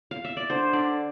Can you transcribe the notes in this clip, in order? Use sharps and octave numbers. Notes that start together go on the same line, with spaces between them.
F5
E5
D5
D3 C5
D3 D5